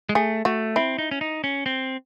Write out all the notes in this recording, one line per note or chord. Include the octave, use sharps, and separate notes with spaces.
G#3
A3 G#4
A3 F#4
C4 E4
D#4
C#4
D#4
C#4
C4